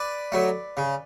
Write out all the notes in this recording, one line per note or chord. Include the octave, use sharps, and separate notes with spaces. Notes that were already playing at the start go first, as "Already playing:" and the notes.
Already playing: B4 D5
F#3 A3
C#3